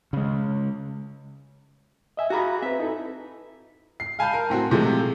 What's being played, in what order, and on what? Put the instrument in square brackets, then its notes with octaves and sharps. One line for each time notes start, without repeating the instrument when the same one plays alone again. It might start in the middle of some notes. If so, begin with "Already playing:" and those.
[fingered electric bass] C#3 G#3
[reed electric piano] D#5 E5 G#5
[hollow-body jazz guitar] F#4 G#4 [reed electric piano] F5 A#5 B5
[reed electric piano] C4 B4 [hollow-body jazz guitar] E5
[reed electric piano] D#4 E4 A4
[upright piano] C7
F5 G#5 A5 B5 G6
A#4
A2 C4 F#4
A2 C3 F3 G#3 A3